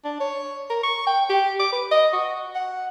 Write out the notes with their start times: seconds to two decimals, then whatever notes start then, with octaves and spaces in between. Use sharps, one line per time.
0.04 D4
0.20 C#5
0.70 A#4
0.83 C#6
1.07 G5
1.29 G4
1.59 D6
1.72 B4
1.91 D#5
2.13 F#4
2.55 F#5